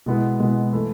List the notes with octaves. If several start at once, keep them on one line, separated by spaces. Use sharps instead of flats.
B2 G#3 B3 E4
B2 G#3 B3 E4
E3 A3 E4